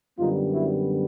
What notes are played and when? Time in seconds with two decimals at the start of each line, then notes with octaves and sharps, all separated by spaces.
0.19 F#2 D3 G3 B3 D#4 F4
0.54 E4 F#4